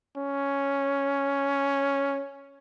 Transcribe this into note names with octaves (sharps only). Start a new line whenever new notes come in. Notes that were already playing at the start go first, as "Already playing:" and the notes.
C#4